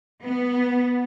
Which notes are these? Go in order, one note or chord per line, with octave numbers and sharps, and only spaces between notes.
B3